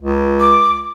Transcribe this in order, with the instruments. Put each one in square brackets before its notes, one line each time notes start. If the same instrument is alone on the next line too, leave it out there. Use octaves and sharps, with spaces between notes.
[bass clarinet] C#2
[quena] D6